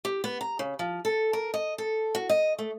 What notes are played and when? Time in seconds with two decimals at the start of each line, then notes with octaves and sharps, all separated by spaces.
0.05 G4
0.24 B3
0.41 A#5
0.59 C#3
0.79 F3
1.05 A4
1.33 A#4
1.54 D#5
1.78 A4
2.15 F#4
2.29 D#5
2.59 A3